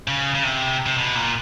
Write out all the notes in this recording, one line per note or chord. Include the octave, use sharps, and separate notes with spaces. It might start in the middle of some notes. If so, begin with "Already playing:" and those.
C#3
C#3
C3
C3
B2
A#2